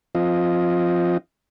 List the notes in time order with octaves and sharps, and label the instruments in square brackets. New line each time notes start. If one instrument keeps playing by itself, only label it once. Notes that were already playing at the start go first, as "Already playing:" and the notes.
[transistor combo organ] F3 C4 F4 D#5